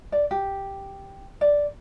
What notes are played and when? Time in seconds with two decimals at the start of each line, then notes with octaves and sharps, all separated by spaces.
0.12 D5
0.31 G4
1.41 D5